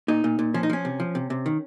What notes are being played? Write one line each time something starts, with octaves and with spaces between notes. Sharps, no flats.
A#2 D#4
A#2
A#2
F3 C#4
D#4
F3 C#4
C3
F3
C3
C3
D#3